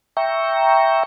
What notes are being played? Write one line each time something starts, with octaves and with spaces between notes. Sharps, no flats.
E5 G5 A#5 C#6